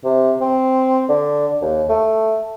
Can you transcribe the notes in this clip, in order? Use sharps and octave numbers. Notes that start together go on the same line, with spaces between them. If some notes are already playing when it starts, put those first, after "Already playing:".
C3
C4
D3
D#2
A3